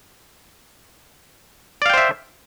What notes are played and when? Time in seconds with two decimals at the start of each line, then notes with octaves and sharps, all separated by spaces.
1.82 D5
1.86 F5
1.90 G5
1.94 C5
1.98 E5